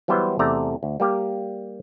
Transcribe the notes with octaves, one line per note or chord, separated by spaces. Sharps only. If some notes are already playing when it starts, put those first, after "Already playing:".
E3 F#3 G3 B3 E4 C5
E2 C3 A3 D5 A#5
D2
G3 A#3 G4